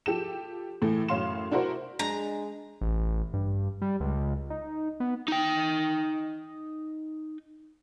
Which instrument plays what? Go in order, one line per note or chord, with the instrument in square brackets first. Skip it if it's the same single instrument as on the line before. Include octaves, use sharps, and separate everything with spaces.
[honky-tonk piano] F3 G4 A4 E7
A2 E3 A3
F#2 A2 C#5 F5 C6 E7
D4 E4 F#4 A#4 C5
[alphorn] G#3 [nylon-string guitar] D4 [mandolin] A#5
[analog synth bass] A1
G2
G3
C#2
D#4
B3
[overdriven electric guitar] D#4 G5